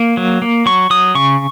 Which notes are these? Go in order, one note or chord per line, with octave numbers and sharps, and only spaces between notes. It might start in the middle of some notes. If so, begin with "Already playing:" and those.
Already playing: A#3
F#3
A#3
F#3 C#6
F#3 D#6
C#3 C#6